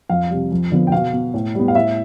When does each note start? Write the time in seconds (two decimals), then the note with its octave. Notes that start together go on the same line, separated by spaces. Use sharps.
0.10 F2 F5
0.30 C3 G3
0.52 F2
0.72 D3 F3 B3
0.87 G5
0.92 B2 F5
1.13 B3
1.34 A2
1.55 G3 B3
1.68 F5
1.75 A2 E5